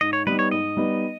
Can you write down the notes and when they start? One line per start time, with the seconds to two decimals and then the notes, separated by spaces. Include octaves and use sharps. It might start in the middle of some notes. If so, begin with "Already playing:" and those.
0.01 G#2 D#5
0.13 C#5
0.27 G3 B3 D#4 B4
0.39 C#5
0.51 G#2 D#5
0.77 G3 B3 D#4